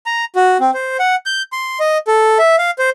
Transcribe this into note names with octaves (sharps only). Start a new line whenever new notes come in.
A#5
F#4
C4
C5
F#5
G6
C6
D#5
A4
E5
F5
C5